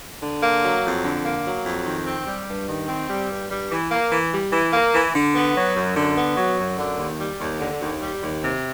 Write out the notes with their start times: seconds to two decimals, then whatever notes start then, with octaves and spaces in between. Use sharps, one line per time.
0.22 D3
0.42 A#3
0.63 F#3
0.84 F2
1.04 D3
1.25 A#3
1.45 F#3
1.65 F2
1.86 D#3
2.07 C4
2.27 G3
2.48 G2
2.68 D#3
2.89 C4
3.09 G3
3.30 G2
3.51 G3
3.71 E3
3.92 A#3
4.11 E3
4.32 G3
4.52 E3
4.73 A#3
4.93 E3
5.14 D3
5.35 B3
5.56 F#3
5.76 F#2
5.96 D3
6.17 B3
6.37 F#3
6.58 F#2
6.78 D3
6.98 D#2
7.19 G3
7.39 D#2
7.60 D3
7.81 D#2
8.02 G3
8.22 D#2
8.43 C3